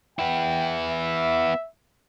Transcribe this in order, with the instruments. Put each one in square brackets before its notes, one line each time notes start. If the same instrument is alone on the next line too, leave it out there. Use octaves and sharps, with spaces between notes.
[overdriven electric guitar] B3 E4 [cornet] G5
[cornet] E5